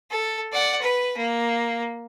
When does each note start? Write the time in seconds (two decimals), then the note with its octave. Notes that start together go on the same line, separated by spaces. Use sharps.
0.11 A4
0.52 D5 F#5
0.81 B4
1.17 A#3